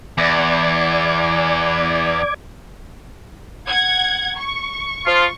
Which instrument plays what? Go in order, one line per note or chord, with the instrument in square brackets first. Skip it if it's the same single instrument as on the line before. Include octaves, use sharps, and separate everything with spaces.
[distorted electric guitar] E2 [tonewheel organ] D5 D6 G#6
[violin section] F#5 G#6
C#6
[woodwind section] F3 F4